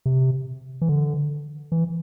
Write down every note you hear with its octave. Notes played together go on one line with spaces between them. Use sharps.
C3
E3
D3
E3